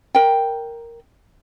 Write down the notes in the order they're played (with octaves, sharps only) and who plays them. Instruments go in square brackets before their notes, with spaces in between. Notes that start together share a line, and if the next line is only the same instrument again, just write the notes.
[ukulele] A#4 G5